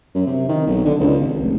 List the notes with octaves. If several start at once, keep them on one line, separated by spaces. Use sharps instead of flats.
F#2
C3
D#3
B1
D3
C#2
G#1
F1